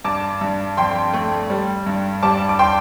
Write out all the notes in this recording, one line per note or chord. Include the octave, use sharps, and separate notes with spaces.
G2 A5 D6
G2
F2 G5 C6
A3
G3
G2
G3 A5 D6
D6
G5 C6